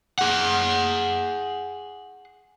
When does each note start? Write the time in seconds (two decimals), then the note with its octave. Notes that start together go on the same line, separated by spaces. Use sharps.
0.19 G#4 F#5